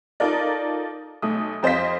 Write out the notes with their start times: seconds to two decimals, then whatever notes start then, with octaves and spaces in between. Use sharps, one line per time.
0.20 D#4 F4 A4 A#4 D5
1.22 B1 A3 D#6
1.63 F2 C5 D#5 F5 B6